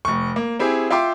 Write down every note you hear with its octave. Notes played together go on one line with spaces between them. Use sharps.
F1 C#6
A#3
C4 E4 G4 G#4
F4 E5 G5 C6 D6